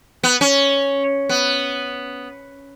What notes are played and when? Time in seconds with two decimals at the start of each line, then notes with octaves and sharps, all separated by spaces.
0.23 B3
0.41 C#4
1.29 B3